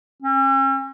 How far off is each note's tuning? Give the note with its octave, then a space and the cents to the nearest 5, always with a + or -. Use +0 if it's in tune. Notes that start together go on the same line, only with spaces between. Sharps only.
C#4 -45